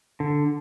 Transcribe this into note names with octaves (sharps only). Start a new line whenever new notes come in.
D3